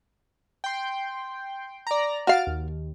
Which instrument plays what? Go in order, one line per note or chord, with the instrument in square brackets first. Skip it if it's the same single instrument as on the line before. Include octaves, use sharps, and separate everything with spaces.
[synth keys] G5 C6
D5 A#5
[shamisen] F#4 F5 [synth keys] F6 A6 D7
[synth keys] D#2